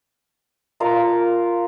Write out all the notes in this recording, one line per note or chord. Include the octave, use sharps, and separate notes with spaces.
F4 A#4 F5 A#5